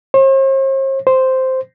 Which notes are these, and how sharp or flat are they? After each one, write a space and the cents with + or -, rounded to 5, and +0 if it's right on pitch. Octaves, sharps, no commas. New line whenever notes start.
C5 +45
C5 -5